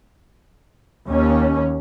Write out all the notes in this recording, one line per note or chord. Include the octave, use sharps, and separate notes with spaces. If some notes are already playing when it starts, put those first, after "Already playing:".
D#2 C#4